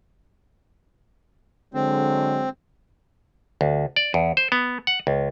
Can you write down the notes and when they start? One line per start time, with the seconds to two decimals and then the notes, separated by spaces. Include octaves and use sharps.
1.74 D3 F#3 G#3 C4
3.61 D2
3.96 D5
4.14 E2
4.37 C5
4.52 B3
4.87 F#5
5.07 C#2